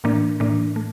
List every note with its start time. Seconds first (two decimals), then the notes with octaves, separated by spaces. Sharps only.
0.04 A2 E3 A#3 D4
0.40 A2 E3 A#3 D4
0.76 A3